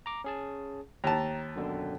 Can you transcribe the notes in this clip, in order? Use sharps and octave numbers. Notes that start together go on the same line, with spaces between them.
A#5 D6
C#4 G#4 A5
D#2 A5 A#5
F#2 B2 D3